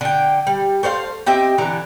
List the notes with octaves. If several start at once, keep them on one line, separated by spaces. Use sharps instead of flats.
D3 G5
G3
A3 C5 C#5 F5
C4 G4 D#5 E5
D3 E3 A#5